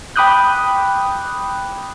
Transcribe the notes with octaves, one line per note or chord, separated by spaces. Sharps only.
G5 B5 D6 D#6 F#6 G6